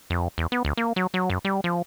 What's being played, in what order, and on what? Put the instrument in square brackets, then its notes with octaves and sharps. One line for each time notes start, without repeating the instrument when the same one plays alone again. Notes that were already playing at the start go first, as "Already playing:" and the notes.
[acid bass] F2
E2
B3
D2
A#3
F#3
F#3
F#2
G3
F3